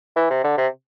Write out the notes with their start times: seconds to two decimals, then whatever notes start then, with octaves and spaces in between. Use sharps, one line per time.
0.16 E3
0.30 C3
0.44 D3
0.58 C3